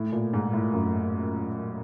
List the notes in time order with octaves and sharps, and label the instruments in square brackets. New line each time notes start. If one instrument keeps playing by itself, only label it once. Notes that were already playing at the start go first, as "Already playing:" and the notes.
Already playing: [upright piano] A2
A#2
G#2
A2
F#2